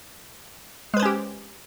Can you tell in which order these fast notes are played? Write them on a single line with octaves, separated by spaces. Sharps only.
G#3 B4 C5 C#4 G4